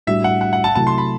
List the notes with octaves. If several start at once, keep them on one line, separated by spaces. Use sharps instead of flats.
A2 G3 D4 F#4 E5
F#5
F#5
F#5
A5
C3 F#3 A3 E4 A5
C6
B5